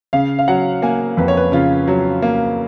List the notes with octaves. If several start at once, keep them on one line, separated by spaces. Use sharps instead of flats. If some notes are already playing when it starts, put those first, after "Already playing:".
C#3 F5
F5
F#3 F#5
A#3 G#5
F2 B4
C#5
B4
C#3 F4
F#3
A#3